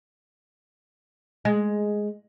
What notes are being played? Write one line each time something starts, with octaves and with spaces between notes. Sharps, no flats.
G#3